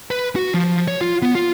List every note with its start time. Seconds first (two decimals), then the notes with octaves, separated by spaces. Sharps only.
0.11 B4
0.36 F#4
0.54 F3
0.88 C#5
1.01 F4
1.22 B3
1.35 F4